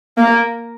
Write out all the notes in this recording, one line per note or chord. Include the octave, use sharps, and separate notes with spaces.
A#3